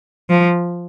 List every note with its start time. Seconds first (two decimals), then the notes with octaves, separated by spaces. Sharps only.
0.30 F3